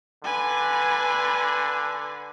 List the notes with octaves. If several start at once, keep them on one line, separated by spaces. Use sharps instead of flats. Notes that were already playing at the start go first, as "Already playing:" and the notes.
D3 B4 G#5